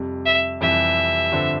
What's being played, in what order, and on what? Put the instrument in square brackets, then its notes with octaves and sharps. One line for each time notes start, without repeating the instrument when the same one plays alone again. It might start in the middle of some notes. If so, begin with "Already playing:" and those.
Already playing: [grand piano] F2 C3 G3
[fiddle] E5
[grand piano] F2 C3 E3 G3 [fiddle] E5
[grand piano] G2 D3 F3 C4